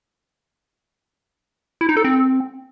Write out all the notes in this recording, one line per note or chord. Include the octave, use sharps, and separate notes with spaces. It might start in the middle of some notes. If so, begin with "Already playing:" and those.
E4
D#4
A4
C4